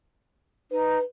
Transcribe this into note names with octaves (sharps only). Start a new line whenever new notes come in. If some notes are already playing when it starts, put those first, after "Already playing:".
D#4 B4